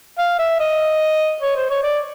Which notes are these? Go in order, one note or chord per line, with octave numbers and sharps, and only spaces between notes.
F5
E5
D#5
C#5
C5
C#5
D5